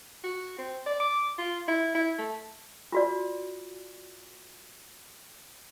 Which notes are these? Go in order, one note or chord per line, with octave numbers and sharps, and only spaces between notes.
F#4
C4
D5
D6
F4
E4
E4
A3
F4 F#4 D5